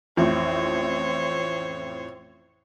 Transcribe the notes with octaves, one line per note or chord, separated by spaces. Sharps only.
A1 F2 A2 C5 C#5